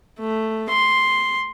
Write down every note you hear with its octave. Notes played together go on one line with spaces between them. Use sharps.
A3
C6